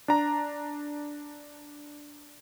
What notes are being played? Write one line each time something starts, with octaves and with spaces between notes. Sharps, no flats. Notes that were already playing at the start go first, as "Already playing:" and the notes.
D4 A#5